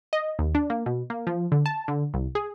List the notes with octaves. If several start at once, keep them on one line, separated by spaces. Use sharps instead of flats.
D#5
D#2
D4
A#3
B2
A#3
F3
D3
A5
D3
C2
G#4